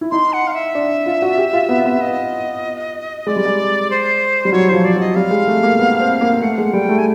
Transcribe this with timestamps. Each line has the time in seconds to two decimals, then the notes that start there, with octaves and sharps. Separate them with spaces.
0.01 E4
0.11 D#4 C6
0.33 F#5
0.47 F5
0.54 E5
0.75 D4
1.06 F4
1.22 F#4
1.38 G4
1.53 F4
1.69 B3
1.85 B3
2.01 D#5
3.27 G#3 D5
3.36 G3
3.45 G#3
3.90 C5
4.45 G3
4.52 F#3 C#5
4.69 F#3 C5
4.74 F3
4.84 D5
4.94 F#3
5.00 D#5
5.16 G3 F5
5.31 G#3
5.48 A3
5.63 A#3
5.79 B3
6.00 C4
6.21 A#3
6.42 A3 F#5
6.58 G#3
6.73 G3 G5
6.89 A3
6.98 G#5